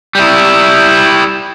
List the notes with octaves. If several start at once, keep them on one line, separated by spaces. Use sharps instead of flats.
G3 E4